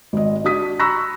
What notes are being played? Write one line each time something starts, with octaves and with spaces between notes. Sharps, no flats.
G#1 D#5
D4 F#4 D#6 B6
A#5 B5 C#6 E6 F#6 A#6